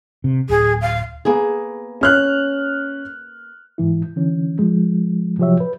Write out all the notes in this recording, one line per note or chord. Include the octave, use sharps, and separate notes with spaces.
C3
D1 G#4
F5
A#3 B3 G#4
C#4 F6 F#6
G#2 E3 E4
D3 E3 C#4
F3 G#3
C3 F3 F#3 G4 C#5 E5
B4